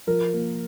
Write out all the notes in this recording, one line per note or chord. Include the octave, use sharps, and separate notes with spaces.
F3 A#4
A#3